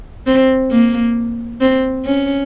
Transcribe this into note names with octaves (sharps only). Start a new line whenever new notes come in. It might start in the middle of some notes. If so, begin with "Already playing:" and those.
C4
A#3
C4
C#4